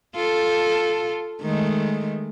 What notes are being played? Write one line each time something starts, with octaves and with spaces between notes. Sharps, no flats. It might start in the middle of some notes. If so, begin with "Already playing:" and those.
F4 A4
D#3 G#3 A3